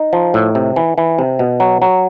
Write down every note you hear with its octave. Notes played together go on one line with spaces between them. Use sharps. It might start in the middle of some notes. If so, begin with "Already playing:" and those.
Already playing: D#4
F3
A2
C3
E3
E3
C3
B2
F#3
F#3